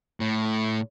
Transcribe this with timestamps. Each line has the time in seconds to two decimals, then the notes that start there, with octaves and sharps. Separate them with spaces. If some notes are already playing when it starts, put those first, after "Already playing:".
0.20 A2